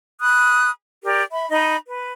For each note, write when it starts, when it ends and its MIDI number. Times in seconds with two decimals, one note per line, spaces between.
0.20 0.70 83
0.20 0.70 87
0.20 0.70 90
1.03 1.22 67
1.03 1.22 70
1.03 1.22 74
1.32 1.47 76
1.32 1.47 83
1.50 1.76 63
1.50 1.76 75
1.50 1.76 83
1.87 2.12 71